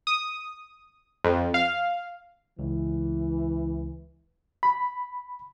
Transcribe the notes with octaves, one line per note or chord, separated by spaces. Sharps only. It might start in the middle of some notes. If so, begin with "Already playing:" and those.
D#6
F2
F5
C#2 E3
B5